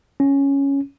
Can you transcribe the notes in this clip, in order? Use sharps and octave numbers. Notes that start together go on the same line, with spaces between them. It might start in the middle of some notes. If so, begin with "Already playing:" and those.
C#4